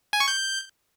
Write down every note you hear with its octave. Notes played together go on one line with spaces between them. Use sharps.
G#5
C#6
G6